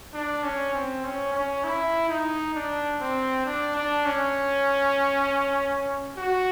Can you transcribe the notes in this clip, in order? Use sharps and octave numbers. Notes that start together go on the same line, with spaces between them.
D4
C#4
C4
C#4
C#4
E4
D#4
D4
C4
D4
D4
C#4
F#4